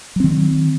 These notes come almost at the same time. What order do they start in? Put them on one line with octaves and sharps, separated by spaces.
F#3 C4 D#3